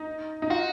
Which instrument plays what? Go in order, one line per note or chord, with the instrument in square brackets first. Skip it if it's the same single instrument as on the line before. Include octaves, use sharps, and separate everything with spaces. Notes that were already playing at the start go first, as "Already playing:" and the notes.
Already playing: [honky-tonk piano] D#4
D#4
[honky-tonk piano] F4 [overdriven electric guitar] F#4